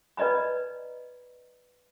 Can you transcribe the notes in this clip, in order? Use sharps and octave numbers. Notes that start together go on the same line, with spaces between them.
B4 D5 D#5 A#5 B5